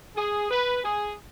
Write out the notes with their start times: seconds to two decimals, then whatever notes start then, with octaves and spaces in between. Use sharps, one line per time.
0.16 G#4
0.51 B4
0.84 G#4